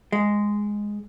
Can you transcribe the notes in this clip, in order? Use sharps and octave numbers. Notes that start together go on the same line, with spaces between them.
G#3